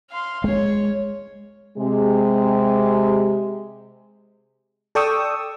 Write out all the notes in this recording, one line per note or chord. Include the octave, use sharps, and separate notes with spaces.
F5 C6
G#3 C#5
C3 G#3
A4 D5 G5 C#6 D#6 E6